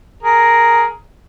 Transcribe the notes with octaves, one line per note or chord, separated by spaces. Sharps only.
G#4 A#4